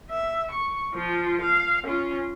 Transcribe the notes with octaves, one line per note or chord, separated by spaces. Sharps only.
E5
C#6
F3 F4
F5
C#4 F4